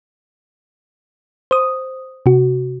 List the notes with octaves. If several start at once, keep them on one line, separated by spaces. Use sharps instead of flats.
C5 D#6
C3 F#4